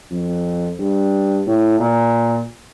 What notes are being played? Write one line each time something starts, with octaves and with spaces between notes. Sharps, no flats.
F2
G2
A2
A#2